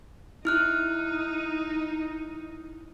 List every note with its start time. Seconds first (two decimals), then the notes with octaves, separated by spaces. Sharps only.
0.45 D#4 E4 F6 F#6